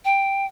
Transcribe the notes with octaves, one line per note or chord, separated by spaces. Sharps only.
G5